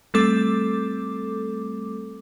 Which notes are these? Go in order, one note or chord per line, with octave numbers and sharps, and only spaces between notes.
G3 A3 C4 A4 D6